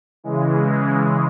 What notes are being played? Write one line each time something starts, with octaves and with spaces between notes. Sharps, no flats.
C#3 E3 G#3